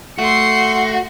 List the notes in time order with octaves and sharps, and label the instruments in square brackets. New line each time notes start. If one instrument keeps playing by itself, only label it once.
[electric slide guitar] A3 [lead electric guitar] F#4 [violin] C6 C#7